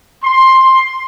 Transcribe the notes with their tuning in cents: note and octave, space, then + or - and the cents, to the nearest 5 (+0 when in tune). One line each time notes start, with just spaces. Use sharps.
C6 +10